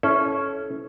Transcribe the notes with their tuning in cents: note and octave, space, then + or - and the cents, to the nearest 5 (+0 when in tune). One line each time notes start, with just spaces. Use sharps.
C#4 +0 E4 -5 A4 -25